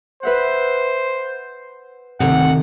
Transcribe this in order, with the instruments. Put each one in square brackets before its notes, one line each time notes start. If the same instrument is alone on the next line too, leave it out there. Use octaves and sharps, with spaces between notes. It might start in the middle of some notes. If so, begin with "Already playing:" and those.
[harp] B4 E5 F#5 [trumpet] C5
[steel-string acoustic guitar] D2 C3 [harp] D#3 [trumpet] F#5